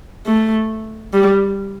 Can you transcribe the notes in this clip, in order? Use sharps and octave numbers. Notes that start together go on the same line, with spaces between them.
A3
G3